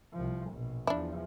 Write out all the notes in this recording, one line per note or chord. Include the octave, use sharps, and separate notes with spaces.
C2 F3
A#1 B2
E2 F3 D4 E4